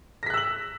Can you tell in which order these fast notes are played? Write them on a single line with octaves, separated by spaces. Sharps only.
A#6 B6 F#6 E6 F#7